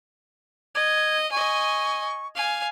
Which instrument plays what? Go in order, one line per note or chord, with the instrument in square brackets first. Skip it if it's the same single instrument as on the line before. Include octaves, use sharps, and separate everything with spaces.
[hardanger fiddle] D#5 [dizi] G#6
[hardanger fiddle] D#5 G#5 [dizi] C#6
[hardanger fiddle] F5 G#5